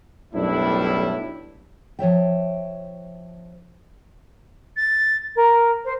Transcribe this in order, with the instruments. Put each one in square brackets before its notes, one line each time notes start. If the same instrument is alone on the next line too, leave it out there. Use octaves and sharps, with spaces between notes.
[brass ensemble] B1 F#2 A2 G3 D4 E4
[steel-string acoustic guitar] F3 C#5 E5 G5
[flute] A6
A#4
C5